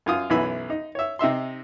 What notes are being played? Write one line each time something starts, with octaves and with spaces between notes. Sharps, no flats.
F#2 F4 D#6
B1 F#2 E3 G#5 B5 E6
D#4
C#5 E5
C3 D#4 E5 C6